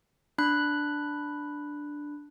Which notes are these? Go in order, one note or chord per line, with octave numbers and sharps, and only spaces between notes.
D4 B5 F#6